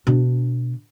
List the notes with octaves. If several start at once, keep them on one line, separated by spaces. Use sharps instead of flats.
B2 D4